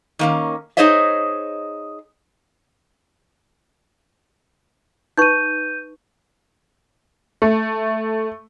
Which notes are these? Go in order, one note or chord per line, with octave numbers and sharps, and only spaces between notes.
D#3 A#3 C#4
D#4 G#4 C5 C#5 D#5 E5
D#4 B4 C#6 G6 D#7
A3